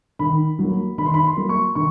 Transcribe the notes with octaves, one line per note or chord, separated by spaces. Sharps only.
D#3 B5
F#3 A#3
D#3 B5
C6
B5
C6
F#3 A#3
C#6
D#3 C#6